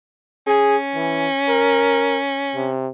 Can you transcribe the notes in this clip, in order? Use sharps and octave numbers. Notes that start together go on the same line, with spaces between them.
C#4 G#4
E3
A#4
C3